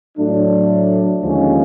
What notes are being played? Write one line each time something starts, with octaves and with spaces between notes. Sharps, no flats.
A2 F#3 A3 D4
D#2 D3 F3 G#3 C#4